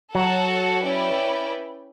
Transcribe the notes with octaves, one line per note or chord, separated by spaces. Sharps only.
F#3 F#4 A4 C#5 F#5 A5
C#4 E4 B4 D5 G5